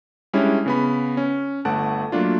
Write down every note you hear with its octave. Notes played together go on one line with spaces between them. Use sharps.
G3 G#3 C#4 D4 E4
C#3 B3 B5
C#4
G1 A3 F#5 A5 F#6 D7
F#3 A3 A#3 D4 F4